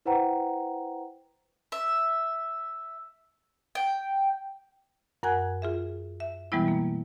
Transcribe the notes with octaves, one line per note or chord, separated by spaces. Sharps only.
E4 B4 C5 F#5 G5 A#5
E5
G5
F#2 A#4 F#5 G#5 F#6 G#6
F4 G#4 E5
E5
B2 E3 G3 G#3 B3 E4
A#3